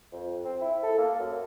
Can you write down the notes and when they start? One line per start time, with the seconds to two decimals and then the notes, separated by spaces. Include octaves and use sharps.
0.12 F2
0.44 C4
0.61 E4
0.83 A4
0.98 A#3
1.19 F#2